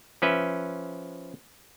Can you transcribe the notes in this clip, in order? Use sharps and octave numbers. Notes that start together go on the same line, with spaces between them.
F3 C#4 B4 E5